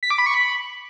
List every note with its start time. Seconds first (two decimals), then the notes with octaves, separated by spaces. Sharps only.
0.03 B6
0.10 D6
0.18 B5
0.26 C#6
0.34 B5